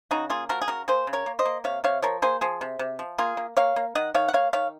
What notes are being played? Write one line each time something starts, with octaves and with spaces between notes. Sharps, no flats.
C#3 D#4 F#4
A#3 F4 G#4
F3 F#4 A#4
G#4
C#3 F#4 A#4
A#3 G#4 C5
C#3
A#4 C#5
A#3
C5 D#5
A#3
C3 C#5 F5
C3 C#5 F5
F3 A#4 C#5
A#3 G#4 C5
F3 G#4 C5
C3
C3
F3
A#3 F4 G#4
A#3
A#3 C#5 F5
A#3
D#3 D#5 F#5
D#3 C#5 F5
F#5
A#3 C#5 F5
D#3 C#5 F5